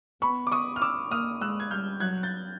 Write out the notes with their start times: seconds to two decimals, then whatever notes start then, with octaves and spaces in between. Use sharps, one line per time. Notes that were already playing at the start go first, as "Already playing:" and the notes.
0.22 B3 B5 C#6
0.47 D6
0.52 C#6 D#6
0.76 F6
0.82 D6 E6
1.11 A#3 D#6 F6
1.41 G#3 E6 F#6
1.60 G#6
1.71 G3 F6 G6
2.00 F#3 F#6 G#6
2.23 G6 A6